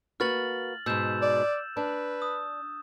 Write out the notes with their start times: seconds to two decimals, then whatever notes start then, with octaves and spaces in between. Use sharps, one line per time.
0.20 A#3 F#4 B4 F6 A6 F#7
0.86 G#2 B2 E6 G6 E7
1.22 D5
1.77 D4 B4
2.22 D#6